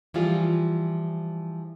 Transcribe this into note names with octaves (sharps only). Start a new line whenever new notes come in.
E3 F3 G3 F4 G#4